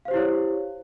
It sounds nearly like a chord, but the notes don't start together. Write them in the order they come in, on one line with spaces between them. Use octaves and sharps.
F5 C5 G4 E4 C#5